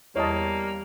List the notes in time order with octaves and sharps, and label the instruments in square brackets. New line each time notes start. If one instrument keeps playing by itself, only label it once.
[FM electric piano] E2 [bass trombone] G3 [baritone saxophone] A#3 [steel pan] C#5 D#5 A5